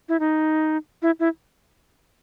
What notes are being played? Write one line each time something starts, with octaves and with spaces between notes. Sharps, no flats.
E4
D#4
E4
E4